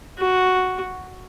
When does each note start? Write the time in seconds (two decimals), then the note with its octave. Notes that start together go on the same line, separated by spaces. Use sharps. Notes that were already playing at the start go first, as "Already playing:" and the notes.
0.19 F#4